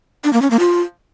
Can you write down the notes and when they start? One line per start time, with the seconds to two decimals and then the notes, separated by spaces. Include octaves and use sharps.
0.24 D4
0.33 A#3
0.42 C#4
0.51 A#3
0.59 F4